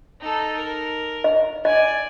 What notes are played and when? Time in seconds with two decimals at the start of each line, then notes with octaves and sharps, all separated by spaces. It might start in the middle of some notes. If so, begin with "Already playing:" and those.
0.21 D#4 A4
0.57 A#4
1.24 D#5
1.65 D5 D#5 G#5